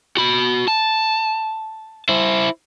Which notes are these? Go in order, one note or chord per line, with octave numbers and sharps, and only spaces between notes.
F#4 B5
A5
E4 C5